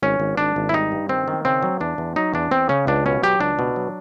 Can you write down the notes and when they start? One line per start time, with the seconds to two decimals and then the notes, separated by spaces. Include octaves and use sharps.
0.02 G#1 C#4
0.20 G#1
0.37 G#1 D4
0.56 G#1
0.69 E4
0.73 G3 D#4
0.92 G2
1.09 D#3 C4
1.28 D#3
1.45 C#3 C4
1.63 F#3
1.80 E2 D4
1.98 E2
2.16 F#3 D#4
2.34 E2 D4
2.51 E2 C4
2.69 C#3 C#4
2.87 C#2 D4
3.06 B2 C#4
3.23 F#3 G4
3.41 C#2 D4
3.59 B2
3.76 F#3